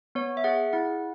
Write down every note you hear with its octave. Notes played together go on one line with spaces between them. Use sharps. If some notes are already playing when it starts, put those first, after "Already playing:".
B3 C#5
E5
G#4 F#5
E4 F#5